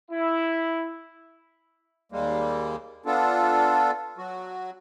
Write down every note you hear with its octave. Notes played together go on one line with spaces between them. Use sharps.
E4
D#2 G3 G#3 A#3
B3 D4 F4 A4
F#3 F#4